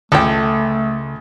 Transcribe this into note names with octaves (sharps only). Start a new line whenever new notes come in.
C#2 C#3 A3 A4 G5